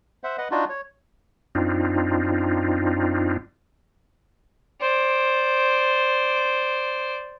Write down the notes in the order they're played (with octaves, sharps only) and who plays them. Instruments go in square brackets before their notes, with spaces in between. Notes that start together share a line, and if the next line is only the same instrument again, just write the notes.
[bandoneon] C5 E5 F#5
B4 D#5 F#5
D4 D#4 F4 F#4
C#5
[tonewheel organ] F#2 C4 D4 D#4 F4
[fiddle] C5 D5